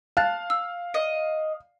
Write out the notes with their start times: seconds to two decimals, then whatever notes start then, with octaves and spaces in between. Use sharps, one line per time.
0.17 F5 A5 F#6 A6
0.50 E6
0.94 D#5